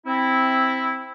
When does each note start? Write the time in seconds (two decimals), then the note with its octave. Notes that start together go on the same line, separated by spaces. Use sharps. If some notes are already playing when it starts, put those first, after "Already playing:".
0.07 C4 E4